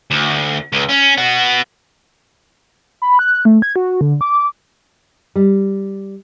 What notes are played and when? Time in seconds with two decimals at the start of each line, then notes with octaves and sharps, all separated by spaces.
0.11 D2
0.72 C#2
0.89 C#4
1.17 B3 F#4
3.02 B5
3.19 F#6
3.45 A3
3.62 G#6
3.76 F#4
4.01 D3
4.21 D6
5.36 G3